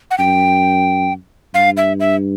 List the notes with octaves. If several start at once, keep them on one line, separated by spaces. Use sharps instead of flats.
F#5
F#2 G5
G2 F5
E5
E5